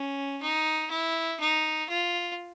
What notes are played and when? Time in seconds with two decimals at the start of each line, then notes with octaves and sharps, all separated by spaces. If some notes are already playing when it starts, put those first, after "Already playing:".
Already playing: C#4
0.42 D#4
0.91 E4
1.40 D#4
1.89 F4